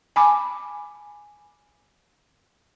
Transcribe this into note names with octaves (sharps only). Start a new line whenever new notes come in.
G#5 A5 B5 D6